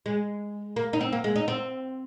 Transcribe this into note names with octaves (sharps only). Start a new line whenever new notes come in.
G#3
A#3
D#4
C4
A#3
G#3
D#4
C4